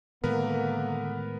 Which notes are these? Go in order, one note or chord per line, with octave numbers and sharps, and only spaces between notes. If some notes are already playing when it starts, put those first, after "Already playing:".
A2 D3 D#3 G#3 A#3 B3 A#4 B4